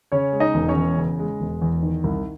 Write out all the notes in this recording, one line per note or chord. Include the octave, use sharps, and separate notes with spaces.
C#3 C#4 C#5
G#3
D#4 D#5
E1
C#4 C#5
E2
C#3
G#3
E1
E2
D#3
C2